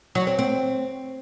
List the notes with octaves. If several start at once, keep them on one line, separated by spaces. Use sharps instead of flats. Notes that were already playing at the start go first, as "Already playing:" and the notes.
F#3
C4
C4